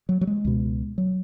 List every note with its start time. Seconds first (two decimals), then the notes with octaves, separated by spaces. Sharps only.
0.09 F#3
0.21 F#3
0.27 G#3
0.45 C#2 B2
0.98 F#3